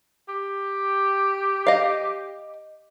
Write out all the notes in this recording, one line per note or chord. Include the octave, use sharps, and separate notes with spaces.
G4
D#5 F5